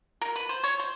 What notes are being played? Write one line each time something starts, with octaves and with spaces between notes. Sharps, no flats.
A#4
B4
C5
C#5
C5